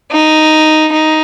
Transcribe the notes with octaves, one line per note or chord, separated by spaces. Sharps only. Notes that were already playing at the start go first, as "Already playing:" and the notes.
D#4
D#4